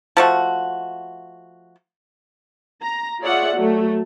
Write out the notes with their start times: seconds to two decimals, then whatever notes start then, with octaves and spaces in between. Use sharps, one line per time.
0.17 F3 A3 F#4
2.83 A#5
3.22 F4 G#4 C#5 D5 E5 F#5
3.55 F#3 A3 F#4